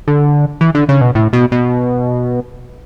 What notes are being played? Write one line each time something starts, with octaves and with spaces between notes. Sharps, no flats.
D3
E3
D3
C#3
B2
A2
B2
B2